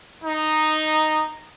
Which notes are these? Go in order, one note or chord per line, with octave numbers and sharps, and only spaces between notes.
D#4